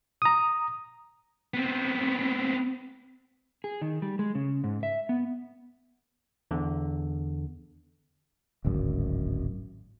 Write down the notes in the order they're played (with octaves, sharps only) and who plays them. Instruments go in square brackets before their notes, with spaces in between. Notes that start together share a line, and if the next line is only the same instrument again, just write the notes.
[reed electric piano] A#5 D#6
[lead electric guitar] B3 C4
[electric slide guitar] G#4
D#3
G3
G#3
C#3
G#2
E5
B3
[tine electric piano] E2 D3
[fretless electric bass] D1 G#1 F#2